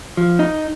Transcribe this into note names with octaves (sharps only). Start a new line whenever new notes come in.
F3
D#4